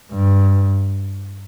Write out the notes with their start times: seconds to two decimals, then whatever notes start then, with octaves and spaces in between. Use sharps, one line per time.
0.12 G2